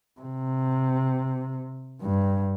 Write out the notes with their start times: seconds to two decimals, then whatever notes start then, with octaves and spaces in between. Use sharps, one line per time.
0.21 C3
2.02 G2